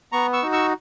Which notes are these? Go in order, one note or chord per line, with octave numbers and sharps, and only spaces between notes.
B3 A#5 C#6
C#6 E6
D#4 F#4
C#6 E6